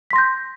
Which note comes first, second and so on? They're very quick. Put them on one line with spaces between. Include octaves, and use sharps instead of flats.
B6 C6 A#6 G6